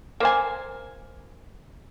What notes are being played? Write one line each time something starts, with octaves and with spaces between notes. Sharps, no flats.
A#3 C5 G#5